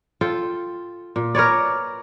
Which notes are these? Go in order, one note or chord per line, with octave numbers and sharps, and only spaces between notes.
F4 A4 G5
A#2
A#4 B4 C#5 D5